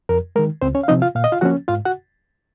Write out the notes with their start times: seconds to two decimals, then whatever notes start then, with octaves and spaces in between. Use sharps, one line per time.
0.09 F2 A#4
0.36 D#3 G#3 A#4
0.62 C#2 C4 C5
0.75 C#4 C#5
0.83 F5
0.88 C3 F3 C4 D#4 D#5
1.02 F4 F5
1.15 A#2 F5
1.24 D#5
1.32 F4 F5
1.41 F3 A#3 C#4 F#4 F#5
1.68 G#2 F4 F5
1.85 F#4 F#5